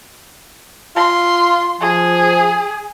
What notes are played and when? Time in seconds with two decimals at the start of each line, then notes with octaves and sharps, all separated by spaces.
0.96 F4 C6
1.81 F3 G#4